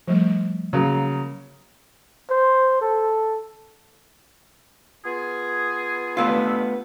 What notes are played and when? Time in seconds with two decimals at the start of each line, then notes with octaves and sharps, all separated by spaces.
0.08 F3 G3 A3
0.73 C#3 F#3 A#3
2.30 C5
2.82 A4
5.04 B3 F4 G#4
6.17 G2 A3 B3 F4 B5 E6